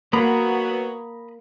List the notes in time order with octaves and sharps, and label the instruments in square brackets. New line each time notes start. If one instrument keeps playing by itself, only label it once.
[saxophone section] F#3 B3 [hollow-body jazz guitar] A#3 [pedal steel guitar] A#5 B5 D#6